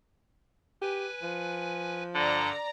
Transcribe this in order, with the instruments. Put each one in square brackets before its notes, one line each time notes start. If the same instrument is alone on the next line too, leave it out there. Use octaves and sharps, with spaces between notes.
[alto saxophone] G4 [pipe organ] B4 G#5
[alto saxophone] F3
[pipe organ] G2 A4 [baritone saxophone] D3 [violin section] D5 A#5